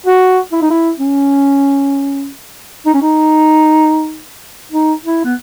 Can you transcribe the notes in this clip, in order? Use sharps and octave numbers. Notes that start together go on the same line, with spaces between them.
F#4
E4
D#4
E4
C#4
D#4
C#4
D#4
D#4
E4
B3